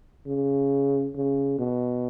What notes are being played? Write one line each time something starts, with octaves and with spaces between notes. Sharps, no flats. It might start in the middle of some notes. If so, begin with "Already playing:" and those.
C#3
C#3
B2